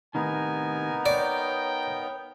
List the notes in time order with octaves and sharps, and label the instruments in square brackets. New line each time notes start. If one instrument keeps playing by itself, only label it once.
[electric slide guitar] A2 C3 D#3 [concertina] B3 D#4 A#4 [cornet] G#5
[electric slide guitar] C#5 [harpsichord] D5 [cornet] G5